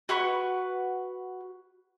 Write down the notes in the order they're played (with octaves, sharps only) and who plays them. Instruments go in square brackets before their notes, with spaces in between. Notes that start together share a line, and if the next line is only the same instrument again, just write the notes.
[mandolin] F#4 B4 F#5 C#6